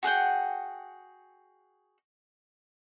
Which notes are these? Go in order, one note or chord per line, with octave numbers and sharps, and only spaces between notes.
F#4 G#4 F#5 G5